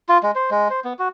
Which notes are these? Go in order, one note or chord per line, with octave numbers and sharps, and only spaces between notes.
F4
G#3
C5
G#3
C5
B3
F#4